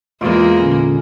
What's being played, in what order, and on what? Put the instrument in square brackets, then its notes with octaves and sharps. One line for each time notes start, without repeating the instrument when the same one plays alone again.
[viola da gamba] E2 G#3 A#3 [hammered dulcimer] F4
[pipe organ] A#2 D3 C#4